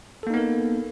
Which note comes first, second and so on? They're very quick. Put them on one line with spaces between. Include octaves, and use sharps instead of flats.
A4 A#3 D#4 B3 A#4